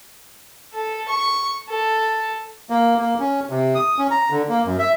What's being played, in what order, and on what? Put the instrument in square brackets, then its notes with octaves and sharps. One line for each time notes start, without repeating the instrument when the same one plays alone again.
[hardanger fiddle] A4
C#6
A4
[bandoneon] A#3
A#3
C#4
C3
D#6
C#4
A#5
D3
A#3
F#2
E5